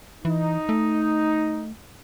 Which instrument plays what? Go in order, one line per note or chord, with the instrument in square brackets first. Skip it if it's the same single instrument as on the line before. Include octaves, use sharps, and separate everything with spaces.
[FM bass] E3 [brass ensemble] D#4
[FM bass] A3